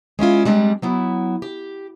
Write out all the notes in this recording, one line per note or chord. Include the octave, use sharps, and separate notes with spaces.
G#3 C#4 E4 F4
G3 G#3 C4 D4
F#3 B3 E4
G4